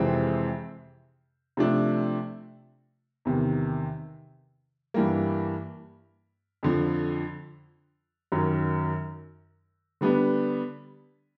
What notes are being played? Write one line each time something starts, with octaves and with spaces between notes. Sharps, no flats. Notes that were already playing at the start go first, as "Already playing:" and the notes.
Already playing: F2 C3 E3 G#3 C4
C3 F3 A3 D4
E2 C3 D#3
G2 E3 G3 A#3
F2 D3 F3
F#2 D#3 F#3
D3 G3 B3 D4